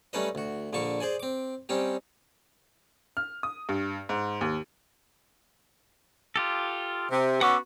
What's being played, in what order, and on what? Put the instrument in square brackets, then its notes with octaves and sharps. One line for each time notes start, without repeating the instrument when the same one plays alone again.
[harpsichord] G3 A3 C#4 D#4 B4 D#5
D2 F#4
A#1 D3 A#3 A5 C#6
G#4 C5 D5 G#5
C4 D6
G3 C4 C#4 D#4 G4
[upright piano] F6
D#6
G2
G#2
D#2
[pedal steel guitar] F4 G4 A4
[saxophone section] C3
[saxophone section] B3 C#4 F#4 [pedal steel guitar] F#5 D6 E6